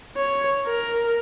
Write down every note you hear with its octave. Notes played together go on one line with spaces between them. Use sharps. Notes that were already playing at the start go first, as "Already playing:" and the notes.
C#5
A#4